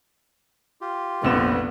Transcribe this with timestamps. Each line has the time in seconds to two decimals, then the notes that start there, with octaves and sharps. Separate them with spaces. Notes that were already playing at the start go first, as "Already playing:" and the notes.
0.81 F4 G4
1.23 F1 A#1 B3 E7